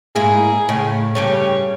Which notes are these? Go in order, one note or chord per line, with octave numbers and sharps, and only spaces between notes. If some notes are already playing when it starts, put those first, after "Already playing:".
G#2 A#3 E4 G#4
A2 C#3
G2 C#3 G4 C#5